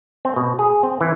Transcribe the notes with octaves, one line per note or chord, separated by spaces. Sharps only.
C4
B2
G#4
C4
E3